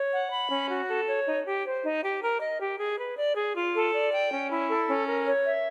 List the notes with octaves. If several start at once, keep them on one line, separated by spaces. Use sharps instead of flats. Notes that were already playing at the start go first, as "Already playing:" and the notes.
Already playing: C#5
F#5
B5
C#4
F#4
A4
C#5
D#4
G4
C5
D#4
G4
A#4
D#5
G4
G#4
B4
D5
G#4
F4
A4
D5
G5
C#4
E4
A4
C#4
A#4
C#5
E5